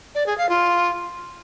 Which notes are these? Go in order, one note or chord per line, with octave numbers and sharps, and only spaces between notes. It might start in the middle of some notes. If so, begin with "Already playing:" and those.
D5
G#4
F5
F4